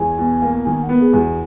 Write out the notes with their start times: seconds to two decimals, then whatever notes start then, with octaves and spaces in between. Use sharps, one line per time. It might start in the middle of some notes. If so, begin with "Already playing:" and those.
Already playing: E2 G#5
0.18 B2
0.42 A#3
0.65 D#3 G#5
0.83 F#5
0.89 B3
1.01 G#4
1.13 E2
1.19 F#4